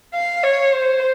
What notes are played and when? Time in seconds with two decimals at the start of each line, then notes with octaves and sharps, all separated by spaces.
0.14 F5
0.44 C#5
0.74 C5